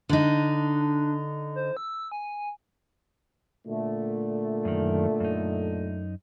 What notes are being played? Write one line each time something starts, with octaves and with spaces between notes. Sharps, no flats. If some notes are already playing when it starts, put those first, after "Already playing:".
D3 D4 D#4
C5
E6
G#5
A#2 D3 A3
F#2 D#3
F#2 D#4